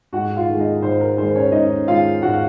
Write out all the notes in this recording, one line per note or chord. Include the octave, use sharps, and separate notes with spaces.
G#2 F#4 F#5
F4 F5
D#3 G#3
D#4 D#5
G#2 C5
A#4
D#3 G#3 C5
C#4 C#5
G#2 D#4 D#5
D#3 G#3 F4 F5
G#2 F#4 F#5
F5